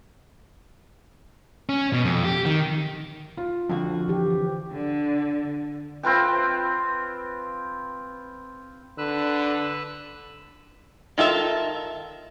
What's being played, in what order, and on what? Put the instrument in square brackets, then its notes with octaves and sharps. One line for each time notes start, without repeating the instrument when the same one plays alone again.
[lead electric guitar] C#4
B2
F2
G4
D#3
[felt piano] F4
[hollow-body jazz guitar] F2 D3 F#4 [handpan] F3
[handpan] E3 G4
[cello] D3
[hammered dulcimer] C4 F4 B4 G5
[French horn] D3 [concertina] B4 E6 F#6
[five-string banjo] D#3 F4 A4 E5 F5